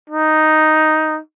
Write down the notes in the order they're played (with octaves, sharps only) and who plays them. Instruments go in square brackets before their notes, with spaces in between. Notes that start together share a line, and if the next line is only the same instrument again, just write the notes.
[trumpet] D#4